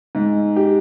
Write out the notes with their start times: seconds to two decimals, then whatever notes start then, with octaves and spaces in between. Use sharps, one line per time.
0.15 G#2
0.56 G4